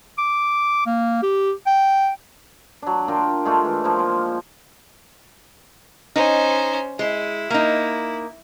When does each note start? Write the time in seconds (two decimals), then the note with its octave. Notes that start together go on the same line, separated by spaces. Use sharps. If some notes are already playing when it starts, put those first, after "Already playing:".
0.18 D6
0.87 A#3
1.22 G4
1.67 G5
2.82 F#3 D4
3.08 D4 F4 A#4 G5
3.45 G#3 A3 D4 F4
3.65 E3
3.84 F3 A#3 C5
3.99 G#3
6.16 C#4 D#4 C5
6.99 G#3 E4
7.50 A#3 D#4